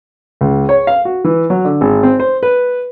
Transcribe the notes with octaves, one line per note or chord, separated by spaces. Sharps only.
C#2
C#5
F5
F#4
E3
F#3
D3
G#1
C4
C5
B4